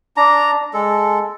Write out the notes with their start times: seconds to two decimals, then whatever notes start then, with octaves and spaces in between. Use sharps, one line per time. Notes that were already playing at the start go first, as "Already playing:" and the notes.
0.17 D4 A#5
0.74 G#3 A4